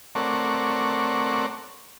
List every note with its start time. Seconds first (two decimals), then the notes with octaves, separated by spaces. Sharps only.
0.15 A3 C4 A#4 C#5 D5 F#5